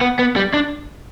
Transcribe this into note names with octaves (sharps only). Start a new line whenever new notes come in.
B3
B3
G3
D4